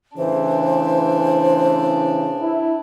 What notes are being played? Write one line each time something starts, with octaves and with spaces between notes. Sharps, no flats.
A2 C#3 E3 D4 C5
E4